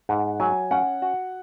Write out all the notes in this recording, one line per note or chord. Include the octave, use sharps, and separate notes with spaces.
G#2 F#5
F#3 G#5
C#4 F#5
F#4